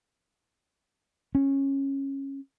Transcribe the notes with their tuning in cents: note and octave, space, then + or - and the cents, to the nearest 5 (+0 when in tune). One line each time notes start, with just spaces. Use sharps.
C#4 -15